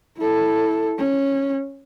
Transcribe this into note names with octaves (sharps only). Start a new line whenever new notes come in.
E4 A4
C#4